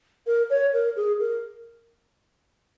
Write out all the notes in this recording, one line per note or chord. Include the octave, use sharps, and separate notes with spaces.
A#4
C#5
A#4
G#4
A#4